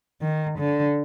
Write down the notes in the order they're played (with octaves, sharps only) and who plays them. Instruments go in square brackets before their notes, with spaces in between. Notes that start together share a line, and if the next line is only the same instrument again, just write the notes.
[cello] D#3
D3